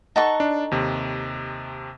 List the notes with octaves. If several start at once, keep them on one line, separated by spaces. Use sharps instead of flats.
D#4 A4 F#5 A5 C#6
D4
D#2 C3